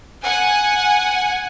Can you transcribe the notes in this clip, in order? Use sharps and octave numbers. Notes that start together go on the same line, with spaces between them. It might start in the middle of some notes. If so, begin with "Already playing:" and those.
F#5 G#5